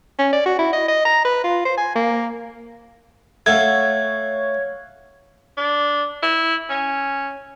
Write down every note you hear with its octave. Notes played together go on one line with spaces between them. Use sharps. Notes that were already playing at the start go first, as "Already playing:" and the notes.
C#4
D5
F#4
E4
D#5
D#5
A#5
B4
F4
C5
G#5
A#3
A3 C#5 F5 F#5 E6 G#6
D4
E4
C#4